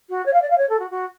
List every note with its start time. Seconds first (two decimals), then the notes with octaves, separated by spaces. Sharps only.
0.10 F#4
0.26 C#5
0.33 F5
0.42 D5
0.50 F5
0.58 C#5
0.69 A4
0.79 F#4
0.91 F#4